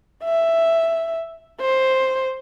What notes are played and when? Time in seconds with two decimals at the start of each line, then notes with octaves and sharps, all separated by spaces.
0.24 E5
1.61 C5